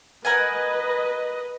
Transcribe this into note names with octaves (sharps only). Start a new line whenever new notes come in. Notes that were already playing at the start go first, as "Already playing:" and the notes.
A#4 B4 D#5 F#5 G#5